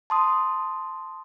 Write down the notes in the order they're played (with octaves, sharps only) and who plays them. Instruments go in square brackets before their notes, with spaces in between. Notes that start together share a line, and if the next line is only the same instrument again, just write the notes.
[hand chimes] A5 C6 D#6